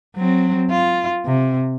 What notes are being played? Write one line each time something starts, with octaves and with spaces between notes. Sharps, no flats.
F#3 C4
F4
C3